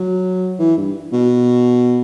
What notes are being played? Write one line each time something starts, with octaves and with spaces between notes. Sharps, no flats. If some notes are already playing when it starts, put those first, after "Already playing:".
Already playing: F#3
E3
G2
B2